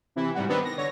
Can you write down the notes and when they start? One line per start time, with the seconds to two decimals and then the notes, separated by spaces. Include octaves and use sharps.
0.16 C3 E3 E4
0.34 G#2 G3 F#4
0.48 D#3 B3 C4 D4
0.64 A#6
0.77 D3 C#5 A#6